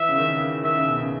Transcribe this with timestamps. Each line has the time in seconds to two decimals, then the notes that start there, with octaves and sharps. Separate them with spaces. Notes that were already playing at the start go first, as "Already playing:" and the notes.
Already playing: E3 E5
0.09 C#3
0.17 D#3
0.26 C#3
0.36 C#3
0.64 D#3 E5
0.75 C#3
0.87 B2
0.98 C#3